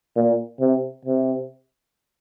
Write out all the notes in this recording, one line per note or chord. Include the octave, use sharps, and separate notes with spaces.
A#2
C3
C3